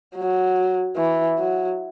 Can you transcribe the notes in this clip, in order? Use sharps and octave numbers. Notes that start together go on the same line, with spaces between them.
F#3
E3
F#3